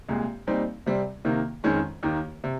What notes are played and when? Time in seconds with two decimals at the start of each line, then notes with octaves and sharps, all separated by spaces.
0.09 C2 A#2 G#3
0.47 A#2 G3 C4 D#4
0.86 C3 G3 C4
1.25 C3 D#3 A#3
1.64 F2 D#3 G#3 C#4
2.03 D#2 D#3 A#3
2.44 C3